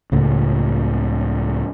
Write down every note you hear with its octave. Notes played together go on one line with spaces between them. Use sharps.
C#2 A2 C#3